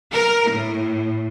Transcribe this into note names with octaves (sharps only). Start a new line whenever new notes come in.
A#4
A2